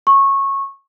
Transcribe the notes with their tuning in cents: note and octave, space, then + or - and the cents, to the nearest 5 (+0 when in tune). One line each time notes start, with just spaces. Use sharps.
C#6 -20